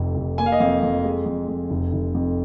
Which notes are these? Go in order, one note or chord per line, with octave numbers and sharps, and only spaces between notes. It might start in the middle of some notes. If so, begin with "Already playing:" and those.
Already playing: F1 F2 C3
F1
A#3 G#5
F5
D#5
F2 F5
F2
G#3
F2
F2
F1
F1
F2